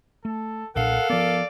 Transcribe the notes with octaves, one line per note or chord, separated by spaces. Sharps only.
A3 A4
B1 A#2 D4 A4 A#4 F5 F#5
F3 B3 D5